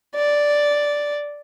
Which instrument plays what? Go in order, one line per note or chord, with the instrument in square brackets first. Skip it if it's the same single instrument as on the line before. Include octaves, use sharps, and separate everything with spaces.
[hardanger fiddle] D5